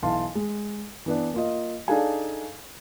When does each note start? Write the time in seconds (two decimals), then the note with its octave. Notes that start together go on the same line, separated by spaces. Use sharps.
0.02 B1 E3 F5 A5 C6
0.35 G#3
1.06 E3 B3 D4
1.34 A#3 F4 D#5
1.88 D4 D#4 G#4 A4 F5 G#5